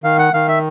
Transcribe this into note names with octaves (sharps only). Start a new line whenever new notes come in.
D#3 F5
F#5
D#3 F5
E5